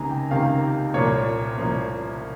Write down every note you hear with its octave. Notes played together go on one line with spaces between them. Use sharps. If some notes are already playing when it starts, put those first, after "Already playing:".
Already playing: C#2 C3 D#3 A#3 G#5 A#5
G5
C#2 C3 D#3 A#3 F5
C2 A#2 F3 A#3 C#5
C2 A#2 F3 A#3